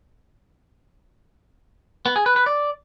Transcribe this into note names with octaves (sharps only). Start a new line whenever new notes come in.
B3
G#4
B4
B4
D5